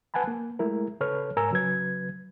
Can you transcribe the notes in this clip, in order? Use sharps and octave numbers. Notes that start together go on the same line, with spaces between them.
B4 F#5 G#5 A5 B5
A#3
G#3 A3 E4 A#4
C#3 A4 B4 C#5 F6
G#2 A#4 C#5 G#5 A#5 E6
C#3 F#3 B4 G#6